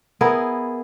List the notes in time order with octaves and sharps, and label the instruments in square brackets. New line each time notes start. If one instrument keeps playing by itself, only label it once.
[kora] B3 E4 G#4 A#4